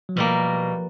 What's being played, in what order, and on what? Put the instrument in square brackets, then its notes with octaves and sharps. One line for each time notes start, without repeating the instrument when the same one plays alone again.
[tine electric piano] F#3
[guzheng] B2 G3 A#3 [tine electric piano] F3